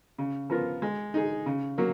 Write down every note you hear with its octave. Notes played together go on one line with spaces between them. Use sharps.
C#3
F3 B3 F4 A#4
G#3
D#4 G#4
C#3
F#3 A#3